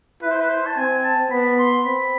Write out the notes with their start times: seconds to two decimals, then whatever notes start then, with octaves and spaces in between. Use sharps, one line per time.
0.22 E4 B4
0.31 C5
0.41 B4
0.49 C5
0.66 A5
0.77 C4 G#5
1.04 A5
1.31 B3 B5
1.59 C6
1.85 C4 B5